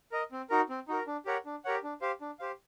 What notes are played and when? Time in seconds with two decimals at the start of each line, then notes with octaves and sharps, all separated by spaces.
0.12 A#4 D#5
0.32 C4
0.50 D#4 F#4 A#4
0.69 C4
0.88 D#4 F#4 A#4
1.07 D4
1.26 G4 A#4 C#5 F#5
1.46 D4
1.65 G4 A#4 C#5 F#5
1.83 D4
2.01 G4 C5 F5
2.21 D4
2.39 G4 C5 F5